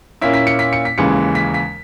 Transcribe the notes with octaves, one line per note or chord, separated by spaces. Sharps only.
A#2 A#3 C#4 E4 B6
B6
C#7
B6
C#7
B6
D#2 C#3 E3 G#3 C#7
B6
B6